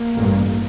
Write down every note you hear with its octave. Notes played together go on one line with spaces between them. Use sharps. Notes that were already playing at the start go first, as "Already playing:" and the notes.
Already playing: A#3
A1 G2